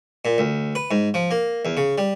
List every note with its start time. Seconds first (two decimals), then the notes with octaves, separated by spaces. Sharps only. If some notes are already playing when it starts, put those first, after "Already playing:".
0.25 A#2
0.38 D2
0.75 B4
0.91 G#2
1.14 F3
1.31 A#3
1.65 E2
1.77 C#3
1.98 G3